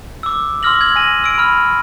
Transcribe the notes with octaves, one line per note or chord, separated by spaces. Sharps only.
D6 E6
C6 D6 E6 F6 A#6 F#7
G#6 F#7
G#5 A#6 D#7 F#7
E6 D7
B5 F6